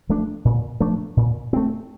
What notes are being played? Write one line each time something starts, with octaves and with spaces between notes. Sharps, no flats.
F3 A3 D4
A#2
F3 A3 D4
A#2
A3 C4